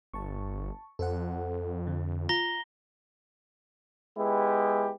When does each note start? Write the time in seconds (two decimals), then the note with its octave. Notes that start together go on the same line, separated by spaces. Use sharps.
0.14 G1 A5 C#6
0.99 F2 A4 C5 F#5
1.87 D3
2.29 F4 A#5 A#6 G7
4.18 G#3 B3 E4 G4